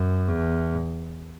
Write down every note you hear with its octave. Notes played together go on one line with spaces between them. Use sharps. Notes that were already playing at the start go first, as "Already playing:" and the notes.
Already playing: F#2
E2